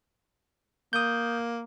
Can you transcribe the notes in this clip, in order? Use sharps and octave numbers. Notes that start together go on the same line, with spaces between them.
A#3 D#6 G6